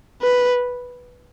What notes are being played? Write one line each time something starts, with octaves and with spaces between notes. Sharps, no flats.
B4